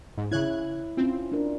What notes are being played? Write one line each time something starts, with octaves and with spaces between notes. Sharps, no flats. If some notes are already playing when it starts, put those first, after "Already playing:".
G#2
C#3 E4 C#5 F#6 G#6
C4 C#4 F4
D4 A#4